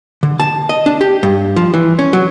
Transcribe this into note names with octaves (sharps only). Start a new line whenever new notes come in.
D3
A5
D#5
D4
G4
G2
F3
E3
C#4
F#3